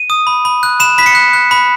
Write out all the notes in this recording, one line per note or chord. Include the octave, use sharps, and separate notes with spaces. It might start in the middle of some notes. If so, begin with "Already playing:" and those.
Already playing: D#7
D#6
B5
B5
F#6
B5 E7
B5 B6
C#7
F#6
F#6
B5